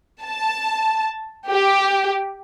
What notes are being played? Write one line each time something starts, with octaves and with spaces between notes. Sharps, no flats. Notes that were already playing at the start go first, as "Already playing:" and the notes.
A5
G4